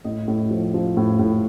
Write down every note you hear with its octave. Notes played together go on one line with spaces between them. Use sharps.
A2 D#5
A2
F3
F3
A2
A2